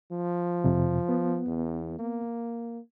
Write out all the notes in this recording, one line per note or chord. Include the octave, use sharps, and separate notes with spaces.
F3
F2 C3
B3
E2
A#3